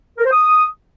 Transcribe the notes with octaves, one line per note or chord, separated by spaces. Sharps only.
A#4
C5
D#6